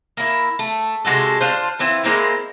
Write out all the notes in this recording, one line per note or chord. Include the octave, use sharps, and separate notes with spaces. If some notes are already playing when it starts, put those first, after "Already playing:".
A#3 E4
A3
C3 G#3 F#4 A4
D4 F4 C5
E3 C4 E4 F4
G#3 A#3 C4 E4